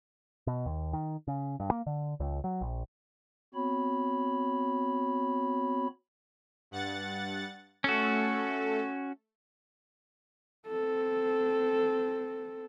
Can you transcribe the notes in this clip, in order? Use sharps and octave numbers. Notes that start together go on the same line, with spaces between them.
B2
D#2
D#3
C#3
G2
A#3
D3
C#2
F#3
A#1
B3 C4 F#4 C#5 B5
G2 F#5 A6
A3 C#4 F#4 A4
C4 A4